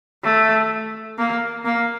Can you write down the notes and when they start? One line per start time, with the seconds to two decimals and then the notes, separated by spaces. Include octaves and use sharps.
0.24 A3
1.18 A#3
1.65 A#3